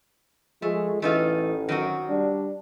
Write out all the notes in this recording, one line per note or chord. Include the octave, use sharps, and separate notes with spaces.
F3 G#3 A3
A1 E3 A3 D#4 F4
F#2 D#3 C4 F#4
G3 D4